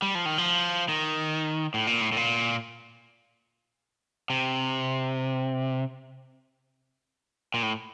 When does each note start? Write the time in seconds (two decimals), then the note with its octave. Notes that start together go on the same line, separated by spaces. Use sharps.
0.02 G3
0.15 F3
0.26 D#3
0.38 F3
0.89 D#3
1.74 A2
1.87 A#2
2.01 A2
2.12 A2
2.17 A#2
4.30 C3
7.54 A#2
7.63 A2